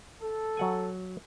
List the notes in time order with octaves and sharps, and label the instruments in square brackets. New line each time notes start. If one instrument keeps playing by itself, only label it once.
[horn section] A4
[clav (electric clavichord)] F#3 F#5 G#5